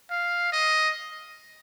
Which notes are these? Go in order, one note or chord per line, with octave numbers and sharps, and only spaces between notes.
F5
D#5